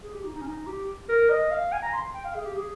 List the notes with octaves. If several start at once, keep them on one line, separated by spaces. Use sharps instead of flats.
G#4
G4
D#4
D#4
C#4
D#4
G4
A#4
D#5
F5
G#5
A#5
C6
G5
F5
G#4
G4
G#4